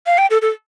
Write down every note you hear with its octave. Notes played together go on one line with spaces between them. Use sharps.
F5
G5
A4
A4